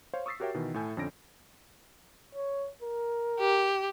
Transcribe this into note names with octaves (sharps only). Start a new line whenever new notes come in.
C5 C#5 F5
C#6 D#6 E6 A6 B6 C7
F#4 G4 A#4 C#5 E5 G5
B2 D#3 E3
A2 E4 A4 G#5 G6
F2 D3 C#4 A#6 D7
C#5
A#4
G4